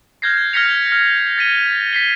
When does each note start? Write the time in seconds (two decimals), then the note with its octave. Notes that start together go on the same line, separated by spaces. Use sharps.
0.22 F6 G6 G#6 A#6 C7
0.53 F6 G#6 A#6 B6 C#7 F7
0.66 G6
0.92 F6
1.38 A6 B6 D#7 G7
1.93 B6 C7 G7